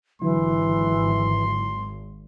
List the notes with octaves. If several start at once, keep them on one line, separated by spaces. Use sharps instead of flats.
G#1 D3 E3 F#3 E4 C6